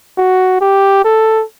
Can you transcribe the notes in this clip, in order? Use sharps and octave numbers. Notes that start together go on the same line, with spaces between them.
F#4
G4
A4